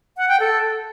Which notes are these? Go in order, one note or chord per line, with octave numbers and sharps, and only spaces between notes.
F#5
G5
A4